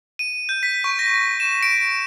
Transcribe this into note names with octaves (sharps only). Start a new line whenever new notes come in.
D#7
G6
B6
C#6
A#6
E7
D7